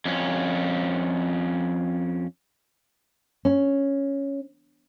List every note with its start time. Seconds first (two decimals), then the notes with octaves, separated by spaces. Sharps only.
0.05 F2 C#4
3.45 C#4